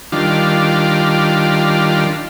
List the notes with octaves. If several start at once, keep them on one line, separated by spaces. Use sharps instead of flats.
D#3 G3 D4 F4